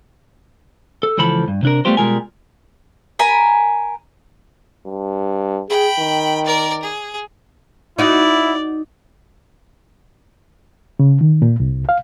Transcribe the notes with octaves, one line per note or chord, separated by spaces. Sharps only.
A4
C#2 E3 F3 A4 B5
G2
C3 D4 A#4
G3 A3 B3 F4 G4 C5
B2 G3 G#3 F4 A#4 G#5
A#4 G#5 B5
G2
G#4 G5 B5
D#3
A#4 D5
G#4
D#4 E4 F#4 D5
C#3
D#3
A#2
C2
F5